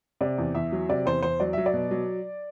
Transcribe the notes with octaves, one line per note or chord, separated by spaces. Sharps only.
C3 D5
E2
E2 E5
F#3
C3 D5
E2 C5
E2 C5
F#3 D5
F#3 E5
D5
B2
F#3